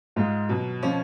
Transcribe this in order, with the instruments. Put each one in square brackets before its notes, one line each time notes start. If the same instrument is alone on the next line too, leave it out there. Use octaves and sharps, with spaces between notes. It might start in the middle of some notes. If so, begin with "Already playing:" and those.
[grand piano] G#2 G#3 [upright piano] F4
[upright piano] B2 [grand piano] F#3
[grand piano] F3 F4 [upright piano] C#4